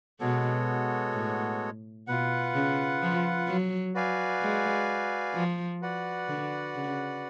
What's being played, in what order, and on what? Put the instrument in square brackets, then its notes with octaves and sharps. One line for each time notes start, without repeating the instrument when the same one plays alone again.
[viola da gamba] B2 [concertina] G#3 B3 F#4 A4 C#5
[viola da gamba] A2
[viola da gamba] B2 [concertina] F4 B4 F#5
[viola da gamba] C#3
F3
F#3
[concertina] F#4 B4 D5 F5 G#5
[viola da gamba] G#3
F3
[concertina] F#4 B4 D5 F#5
[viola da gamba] D3
C#3